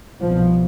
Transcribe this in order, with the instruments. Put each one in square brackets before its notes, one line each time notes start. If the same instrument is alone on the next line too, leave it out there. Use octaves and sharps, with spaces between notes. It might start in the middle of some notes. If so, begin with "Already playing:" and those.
[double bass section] C2 B2 F3